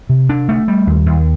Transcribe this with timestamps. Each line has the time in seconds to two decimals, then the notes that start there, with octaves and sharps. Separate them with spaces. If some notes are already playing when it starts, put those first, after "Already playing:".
0.09 C3
0.30 D4
0.49 A3
0.68 G3
0.87 D#2
1.06 D#2